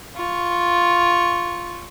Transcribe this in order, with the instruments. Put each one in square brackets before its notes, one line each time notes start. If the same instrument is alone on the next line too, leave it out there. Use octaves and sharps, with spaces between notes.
[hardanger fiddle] F4 C#6